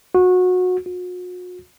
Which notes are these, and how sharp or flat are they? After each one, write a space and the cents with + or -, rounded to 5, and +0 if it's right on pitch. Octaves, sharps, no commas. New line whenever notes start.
F#4 -20
F#4 -40